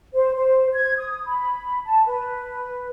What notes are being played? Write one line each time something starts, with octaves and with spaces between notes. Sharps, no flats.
C5
C5
G#6
D#6
B5
A5
B4